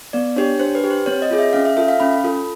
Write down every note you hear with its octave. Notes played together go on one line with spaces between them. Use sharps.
B3 D5
D4 G4 C#5
D4 C5
B4
G4
C5
C4 C#5
D#5
F4 G#4
E5
C#4 F5
E5
F4 A4 E5
F5
C#4 B5
F4 A4